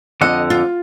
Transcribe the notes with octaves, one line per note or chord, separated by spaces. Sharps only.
F2 D3 D#5 F#5
F4